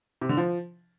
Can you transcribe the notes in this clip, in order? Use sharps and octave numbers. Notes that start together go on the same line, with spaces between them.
C3
D3
F3